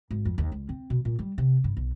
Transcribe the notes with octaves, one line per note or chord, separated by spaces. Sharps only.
G#1
F2
D#2
C#2
C4
B2
A#2
G3
C3
G2
B1